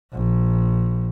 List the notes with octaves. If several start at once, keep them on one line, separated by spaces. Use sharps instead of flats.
A#1